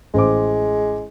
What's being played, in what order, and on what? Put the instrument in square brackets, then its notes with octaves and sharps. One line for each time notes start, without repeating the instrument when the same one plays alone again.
[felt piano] A1 C5 D6 [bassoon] G#3